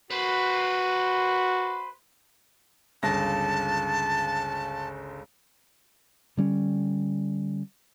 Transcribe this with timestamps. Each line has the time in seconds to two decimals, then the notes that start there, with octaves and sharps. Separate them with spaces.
0.10 F#4 B4 C5
3.03 G1 C#2 A5 A#6
6.37 D3 G3 C#4